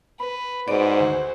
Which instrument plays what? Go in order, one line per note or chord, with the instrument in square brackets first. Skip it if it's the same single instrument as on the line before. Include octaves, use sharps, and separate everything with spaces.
[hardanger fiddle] B4 [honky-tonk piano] B5
[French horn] G#2 [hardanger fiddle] F#4 C5 [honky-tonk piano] B4 D5 D7
[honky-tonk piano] D2